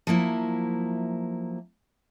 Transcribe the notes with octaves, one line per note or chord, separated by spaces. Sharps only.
F3 F#3 A#3 E4